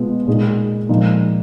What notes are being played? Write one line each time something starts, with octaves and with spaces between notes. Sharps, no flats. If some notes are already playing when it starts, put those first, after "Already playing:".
Already playing: B2 G#3 B3 F4
A#2 G#3 D#4 G#4
A#2 F3 G#3 D#4